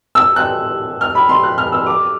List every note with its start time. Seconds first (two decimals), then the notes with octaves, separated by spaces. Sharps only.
0.15 E6
0.36 F#6
1.01 F6
1.15 B5
1.29 C6
1.43 F#6
1.58 F6
1.72 E6
1.87 D6